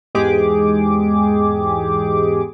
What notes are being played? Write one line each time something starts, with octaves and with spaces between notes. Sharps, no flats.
E2 G#2 G#3 G4 G#4 D6